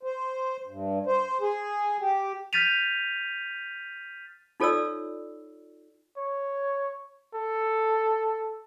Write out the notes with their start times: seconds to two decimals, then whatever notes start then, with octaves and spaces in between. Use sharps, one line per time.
0.03 C5
0.67 G2
1.06 C5
1.41 G#4
2.00 G4
2.53 F6 G6 A6 B6 D#7 F7
4.60 D#4 F4 A4 C#5 D5 E6
6.18 C#5
7.35 A4